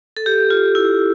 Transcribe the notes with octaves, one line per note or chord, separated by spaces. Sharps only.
A4
G4
F4
E4